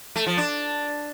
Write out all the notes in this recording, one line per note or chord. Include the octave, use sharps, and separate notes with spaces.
A3
F3
D4